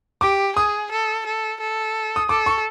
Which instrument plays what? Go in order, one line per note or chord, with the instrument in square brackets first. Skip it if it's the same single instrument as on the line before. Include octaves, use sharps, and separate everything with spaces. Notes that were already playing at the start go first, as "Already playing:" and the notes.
[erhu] G4 [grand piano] D6
[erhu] G#4 [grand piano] D#6
[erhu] A4
A4
A4
[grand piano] D#6
[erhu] A4 [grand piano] D6
[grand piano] C#6